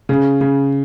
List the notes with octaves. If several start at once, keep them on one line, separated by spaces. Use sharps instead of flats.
C#3
C#3